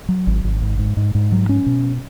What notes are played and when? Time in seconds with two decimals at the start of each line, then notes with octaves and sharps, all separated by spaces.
0.09 F#3
0.27 G#1
0.44 G#1
0.62 G#2
0.79 G#2
0.97 G#2
1.15 G#2
1.32 F#3
1.49 C#4
1.66 B2